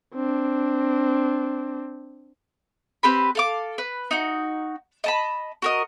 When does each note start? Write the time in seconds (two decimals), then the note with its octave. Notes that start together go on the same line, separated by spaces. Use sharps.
0.14 C4 D4
3.03 C4 G4 B4 B5
3.35 A4 F5 D6
3.78 B4
4.11 D#4 F#4
5.04 D#5 A5 B5
5.62 F#4 A#4 D#5